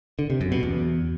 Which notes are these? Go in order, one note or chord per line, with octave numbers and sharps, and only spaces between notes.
D3
C3
F#2
B2
E2